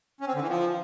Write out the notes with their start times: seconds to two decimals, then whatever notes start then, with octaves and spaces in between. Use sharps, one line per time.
0.21 C#4
0.28 C4
0.35 D3
0.42 E3
0.49 F3